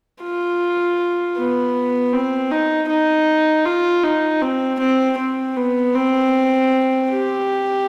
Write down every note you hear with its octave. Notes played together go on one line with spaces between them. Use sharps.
F4
B3
C4
D#4
D#4
F4
D#4
C4
C4
C4
B3
C4
G4